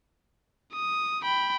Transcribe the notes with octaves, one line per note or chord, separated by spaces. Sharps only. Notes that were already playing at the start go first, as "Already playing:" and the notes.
D#6
G5 B5